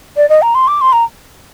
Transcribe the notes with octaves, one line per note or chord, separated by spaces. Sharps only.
D5
D#5
A#5
C6
D6
C6
A#5